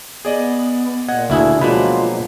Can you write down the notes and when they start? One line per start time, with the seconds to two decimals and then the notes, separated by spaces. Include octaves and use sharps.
0.25 B3 G#4 D5 D#5
1.09 A#2 D#5 F#5 G#6
1.30 D2 D4 E4 G#4 E5
1.61 B2 F3 F#3 G#3 A#3 D4 F4 B5